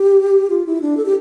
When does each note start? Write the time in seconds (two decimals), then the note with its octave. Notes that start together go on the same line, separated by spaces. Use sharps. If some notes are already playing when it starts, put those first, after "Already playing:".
Already playing: G4
0.50 F4
0.66 E4
0.82 D4
0.97 A4
1.05 G4